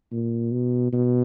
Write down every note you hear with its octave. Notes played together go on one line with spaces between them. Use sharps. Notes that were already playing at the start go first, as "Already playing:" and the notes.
A#2
B2
B2